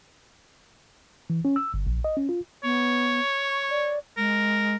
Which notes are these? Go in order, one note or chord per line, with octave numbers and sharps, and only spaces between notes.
E3
C#4
E6
G1
A#1
D#5
C#4
F4
B3 C#5
C#6
D5
G#3 A#4